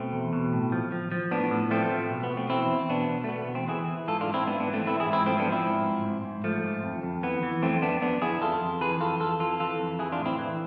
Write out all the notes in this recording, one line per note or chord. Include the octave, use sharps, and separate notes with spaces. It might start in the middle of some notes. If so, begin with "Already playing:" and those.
Already playing: B2 A3 C4
E2
B2
A2
F3
F3
F3
A2 B3 D4
A2
F3 A3 C4
F3
B2
B3
B2
A3 C4
E2 C4 E4
E2
B2 B3 D4
B2
A3
B2 B3
B3
E2
A3 C4
E3 E4 G#4
E3
G#2 F4 A4
D4 F4
G#2
C4 E4
G#2 B3 D4
B3 D4
E3
A3 C4
E3 C4 E4
E4 G#4
G#2
C4 E4
F3 A3 C4
B3 D4
F3
C4 E4
G#2
G#2
G#2
G#2
F3 A3
G#2
F2
F2
E3 B3
E3
F2 A3 C4
F2 B3 D4
F2 B3 D4
F2 E4 G#4
F2 F4 A4
F2
E3 G#4 B4
F2 F4 A4
F2 F4 A4
E3 F4 A4
E3 F4 A4
F2
E3 E4 G#4
D4 F4
A2
C4 E4
E3